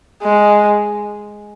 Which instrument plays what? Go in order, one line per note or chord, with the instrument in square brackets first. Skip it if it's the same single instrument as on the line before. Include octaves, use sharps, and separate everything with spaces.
[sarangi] G#3